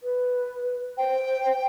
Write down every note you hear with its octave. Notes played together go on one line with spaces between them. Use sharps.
B4
C5 G5